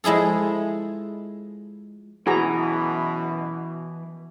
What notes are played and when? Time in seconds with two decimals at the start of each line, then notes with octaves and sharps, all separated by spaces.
0.04 F3 G#3 E4 G#4 A4
2.27 F#2 B2 E3 F#4 G#4 A#5